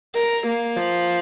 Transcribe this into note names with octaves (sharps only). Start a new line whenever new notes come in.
A#4
A#3
F3